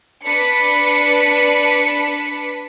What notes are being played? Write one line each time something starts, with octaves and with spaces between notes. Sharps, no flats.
D4 B4 B6 C#7